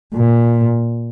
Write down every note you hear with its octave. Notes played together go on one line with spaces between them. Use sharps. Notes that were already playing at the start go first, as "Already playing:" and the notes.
A#2